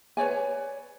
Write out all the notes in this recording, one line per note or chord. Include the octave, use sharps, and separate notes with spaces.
B4 C#5 D5 G#5